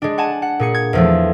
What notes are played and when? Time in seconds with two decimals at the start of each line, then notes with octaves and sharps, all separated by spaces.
0.02 G#3 D4
0.18 F#5 G#5 A5
0.42 F#5
0.59 A#2 G#4 C#7
0.74 G#6
0.93 E2 F3 A3